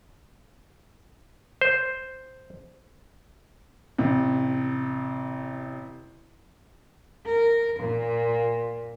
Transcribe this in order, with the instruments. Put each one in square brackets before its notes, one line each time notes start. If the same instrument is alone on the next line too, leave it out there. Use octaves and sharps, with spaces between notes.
[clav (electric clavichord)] C5
[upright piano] A1 C3
[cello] A#4
A#2